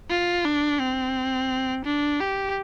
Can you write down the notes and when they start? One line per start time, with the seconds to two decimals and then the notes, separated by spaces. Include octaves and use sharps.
0.10 F4
0.45 D4
0.80 C4
1.85 D4
2.20 G4